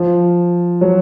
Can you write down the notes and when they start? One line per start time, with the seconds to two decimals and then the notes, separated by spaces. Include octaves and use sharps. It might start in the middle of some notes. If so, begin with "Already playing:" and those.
Already playing: F3
0.81 F#3